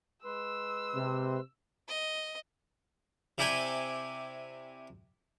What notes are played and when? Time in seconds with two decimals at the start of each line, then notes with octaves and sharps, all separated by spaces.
0.25 G#3 B4 C6 E6
0.95 C3
1.88 D#5
3.38 C3 E4 D5 G5 G#5